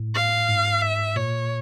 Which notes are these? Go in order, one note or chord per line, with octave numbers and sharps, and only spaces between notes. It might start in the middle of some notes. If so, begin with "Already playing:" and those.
Already playing: A2
F5
G#2
E5
A#2 C#5